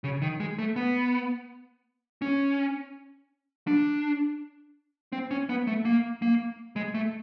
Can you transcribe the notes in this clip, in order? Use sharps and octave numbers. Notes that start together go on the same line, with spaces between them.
C#3
D#3
G#3
A3
B3
C#4
D4
C4
C#4
B3
A3
A#3
A#3
G#3
A3